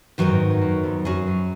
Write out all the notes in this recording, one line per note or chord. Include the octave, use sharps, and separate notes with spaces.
F#2 D#3 F#3 B3 D#4 A#4
G#2
G#2
F#2
F#2
F2
F#2 F#3 C#4 G#4
F#2